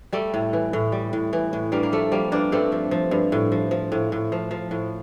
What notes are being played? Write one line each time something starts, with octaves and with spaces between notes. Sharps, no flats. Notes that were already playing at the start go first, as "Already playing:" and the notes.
G3 A3
A2
E3
A2
G3
A2
E3
A2
G2 G3 A#3
A#3
F3 A3
F3 G3 A#3
G2 A#3 D4
G2 A3 C4
F3
F3
G2
A2
F3
F3
A2
A2
F3
F3
A2